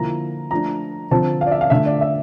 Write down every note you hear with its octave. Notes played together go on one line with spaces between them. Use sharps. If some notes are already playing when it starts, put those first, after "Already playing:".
Already playing: D3 F3 A#3 E4 A#5
F3 A3 D4 A#5
D3 F3 C4 A5
F5
D5
E5
F5
D3 A3 D4 E5
D5
E5